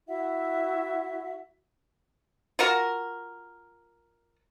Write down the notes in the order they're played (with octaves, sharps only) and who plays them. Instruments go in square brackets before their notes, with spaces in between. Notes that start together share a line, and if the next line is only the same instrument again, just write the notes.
[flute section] E4 F#4 E5 F#5
[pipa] F4 F#4 A#4